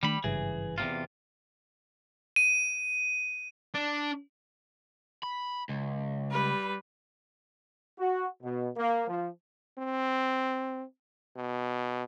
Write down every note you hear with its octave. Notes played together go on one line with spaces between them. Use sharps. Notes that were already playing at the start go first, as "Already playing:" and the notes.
D#3 G3 A3 D4 B5
G#1 G2 C#3 E3 G#4
E2 C3 F4
D#7
D4
B5
C#2
G3 B4
F#4
B2
A#3
F3
C4
B2